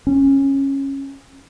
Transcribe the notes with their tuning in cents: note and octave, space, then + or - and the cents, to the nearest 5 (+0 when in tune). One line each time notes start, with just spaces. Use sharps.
C#4 -15